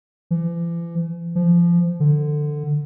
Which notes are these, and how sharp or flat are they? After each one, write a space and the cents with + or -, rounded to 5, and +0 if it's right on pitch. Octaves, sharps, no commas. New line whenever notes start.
E3 +45
F3 -20
D3 +15